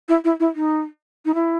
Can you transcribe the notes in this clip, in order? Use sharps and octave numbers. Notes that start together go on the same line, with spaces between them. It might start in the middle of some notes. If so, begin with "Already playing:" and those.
E4
E4
E4
D#4
D#4
E4